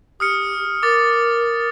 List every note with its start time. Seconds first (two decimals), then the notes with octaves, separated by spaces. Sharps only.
0.20 G4 D#6 F6 C#7
0.83 A#4 D6 A6